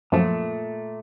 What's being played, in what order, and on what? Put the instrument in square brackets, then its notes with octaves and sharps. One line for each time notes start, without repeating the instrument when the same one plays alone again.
[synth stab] F#2 F3 [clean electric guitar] A#2 A3